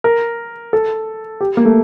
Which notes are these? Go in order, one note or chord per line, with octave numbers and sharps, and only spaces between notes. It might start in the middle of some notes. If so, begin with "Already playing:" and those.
A#4
A4
G4
A#3
A3